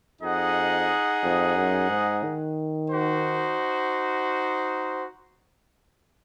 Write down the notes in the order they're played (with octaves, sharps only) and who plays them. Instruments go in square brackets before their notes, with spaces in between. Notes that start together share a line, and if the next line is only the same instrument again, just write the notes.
[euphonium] F2 [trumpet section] D#4 G#4 D#5 F#5
[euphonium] F2
F#2
G#2
D#3
[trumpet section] D#4 F#4 C5